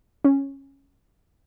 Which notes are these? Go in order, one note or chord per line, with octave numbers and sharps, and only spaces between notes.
C#4